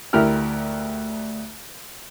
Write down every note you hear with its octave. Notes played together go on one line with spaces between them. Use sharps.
D2 E4 G4 A#4 F6